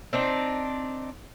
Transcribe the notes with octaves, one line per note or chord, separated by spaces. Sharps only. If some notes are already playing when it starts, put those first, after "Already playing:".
C4 D4 D#4